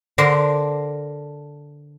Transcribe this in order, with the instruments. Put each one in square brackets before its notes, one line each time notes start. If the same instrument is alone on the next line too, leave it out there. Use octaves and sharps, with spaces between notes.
[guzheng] D3 D4 A#4 C5